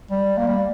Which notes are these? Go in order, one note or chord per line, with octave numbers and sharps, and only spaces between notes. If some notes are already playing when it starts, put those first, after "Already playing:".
G3
A#3
G3